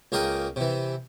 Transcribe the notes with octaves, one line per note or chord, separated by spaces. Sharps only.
C#2 A#3 G#4 A#4 G5 D6
C3 E3